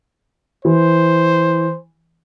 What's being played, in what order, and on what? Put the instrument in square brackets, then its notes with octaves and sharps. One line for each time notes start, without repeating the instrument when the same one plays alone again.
[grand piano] E3 [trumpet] C5